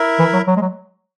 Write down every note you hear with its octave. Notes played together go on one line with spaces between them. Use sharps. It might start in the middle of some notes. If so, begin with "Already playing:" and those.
Already playing: E4 A#4 E5
E3
F#3
F#3
G#3
F#3